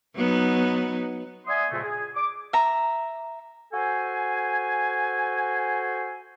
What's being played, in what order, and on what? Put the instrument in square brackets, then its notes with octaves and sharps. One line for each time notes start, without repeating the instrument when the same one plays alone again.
[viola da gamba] F#3 B3 D#4
[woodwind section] D5 E5 F#5 G#5 C6 D#6
F2 A#2 C#3 G#3 A3
G#4
D6
[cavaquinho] E5 A#5
[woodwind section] F#4 A4 C5 G#5